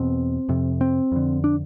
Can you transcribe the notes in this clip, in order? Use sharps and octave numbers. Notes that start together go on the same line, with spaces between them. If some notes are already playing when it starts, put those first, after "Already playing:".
Already playing: E2 B2 C4
F2 C3
C4
F2 D3
D4